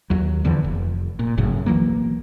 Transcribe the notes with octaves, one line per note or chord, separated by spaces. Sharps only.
D#2 F#3
E2 D3 E3 F3
F1
A#2
G1 F#2 A2 C#3
B1 E3 F#3 A#3